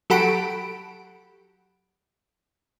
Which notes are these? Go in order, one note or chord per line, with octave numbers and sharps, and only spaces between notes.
F#3 G4 A4 F#5 B5 D7